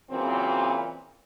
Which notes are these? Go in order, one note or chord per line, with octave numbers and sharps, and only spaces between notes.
A#2 C#3 E3 F#3 C4